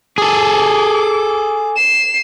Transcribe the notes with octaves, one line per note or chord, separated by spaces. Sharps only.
G#4 A4 D6
C7 E7